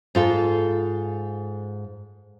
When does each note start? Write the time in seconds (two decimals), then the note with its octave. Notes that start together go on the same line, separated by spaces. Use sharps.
0.15 G#2 F4 A4